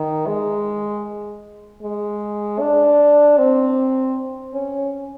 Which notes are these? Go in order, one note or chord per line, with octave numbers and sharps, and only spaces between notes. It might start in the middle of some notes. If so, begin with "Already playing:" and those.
Already playing: D#3
G#3
G#3
D4
C4
C#4